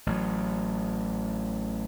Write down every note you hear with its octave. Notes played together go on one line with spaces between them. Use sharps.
A1 F#3